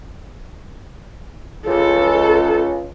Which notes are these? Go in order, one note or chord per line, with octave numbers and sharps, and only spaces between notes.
C#2 A4